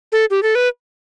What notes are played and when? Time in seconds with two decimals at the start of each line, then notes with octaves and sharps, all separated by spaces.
0.12 A4
0.30 G4
0.43 A4
0.55 B4